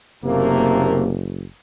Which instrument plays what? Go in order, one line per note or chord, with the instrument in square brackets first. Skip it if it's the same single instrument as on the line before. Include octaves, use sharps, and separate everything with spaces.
[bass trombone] F#1 [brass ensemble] C3 A3 A#3